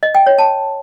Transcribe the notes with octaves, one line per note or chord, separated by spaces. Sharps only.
D#5
G5
C#5
A5